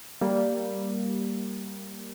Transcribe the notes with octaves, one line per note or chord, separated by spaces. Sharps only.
G3 A#3